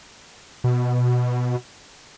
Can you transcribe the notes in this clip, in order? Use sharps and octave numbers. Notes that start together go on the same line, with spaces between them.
B2